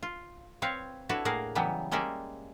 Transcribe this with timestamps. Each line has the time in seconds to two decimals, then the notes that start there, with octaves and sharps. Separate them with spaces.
0.03 F4
0.62 C4 B4 C#5 F5
1.09 D4 E4 F#4 A4 B4 C#5
1.25 A2 A#3 F#4 G#4 A#4 F5
1.55 C#3 E3 F#3 G3 B3
1.91 G3 G#3 A#3 C#4 D5 E5